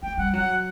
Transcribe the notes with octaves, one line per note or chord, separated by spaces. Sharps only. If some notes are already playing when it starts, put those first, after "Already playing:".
A3 G5
G3 F#5
F#3 F#5